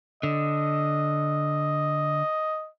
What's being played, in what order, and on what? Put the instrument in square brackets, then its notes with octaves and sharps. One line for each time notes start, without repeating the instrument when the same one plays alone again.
[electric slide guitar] D3 [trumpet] D#5